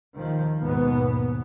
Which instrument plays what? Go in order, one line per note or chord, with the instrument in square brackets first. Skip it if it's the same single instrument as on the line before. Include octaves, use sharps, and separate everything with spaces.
[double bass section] D#2 D#3 F3
D#2 G#2 B2 B3